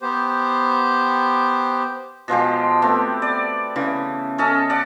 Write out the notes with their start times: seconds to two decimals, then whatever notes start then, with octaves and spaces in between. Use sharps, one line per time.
0.01 B3 G4 C5
2.28 B2 F3 G#3 G4
2.82 A3 B3 C4
3.22 D5
3.76 C#3 E3
4.38 C#4 A4 D#5
4.70 D5 F#5